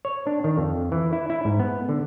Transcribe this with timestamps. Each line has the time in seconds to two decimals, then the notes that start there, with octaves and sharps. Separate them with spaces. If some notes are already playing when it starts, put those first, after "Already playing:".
0.05 C#5
0.27 D4
0.44 D#3
0.58 F2
0.92 E3
1.13 E4
1.30 E4
1.45 G#2
1.60 B3
1.89 D3